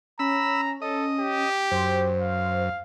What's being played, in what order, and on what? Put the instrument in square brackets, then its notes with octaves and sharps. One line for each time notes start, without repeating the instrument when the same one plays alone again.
[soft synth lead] C#4 [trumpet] A#5 [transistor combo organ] B5 E6
[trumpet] A4 [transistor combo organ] D#5
[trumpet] G4
[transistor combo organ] F#2 [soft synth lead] C5
[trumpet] F5